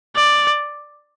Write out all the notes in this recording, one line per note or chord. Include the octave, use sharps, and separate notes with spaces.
D5